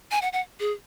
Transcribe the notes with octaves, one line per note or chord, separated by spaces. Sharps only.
G#5
F#5
F#5
G#4